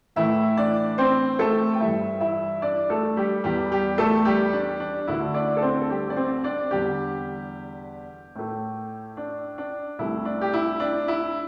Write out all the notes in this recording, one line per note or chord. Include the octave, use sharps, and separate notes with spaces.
A2 E3 A3 E4 E5
D4 D5
C4 C5
A3 A4
G5
G2 E3 G3 E4 E5
E4 E5
D4 D5
A3 A4
G3 G4
E2 E3 G3 G4
G3 G4
A3 A4
G3 G4
D4
D4
D2 D3 A3 E4
D4 D5
A4
C4 C5
A4
G3 G4
D5
C4 C5
D4 D5
E2 D3 G3 G4
A2 A3
D4
D4
C2 C3 A3 E4
D4
G4
E4
D4
E4